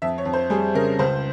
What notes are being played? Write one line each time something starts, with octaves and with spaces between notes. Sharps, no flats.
F2 E5
C#5
F2
C5
G3 G#4
C#3 A#4
C#2 C5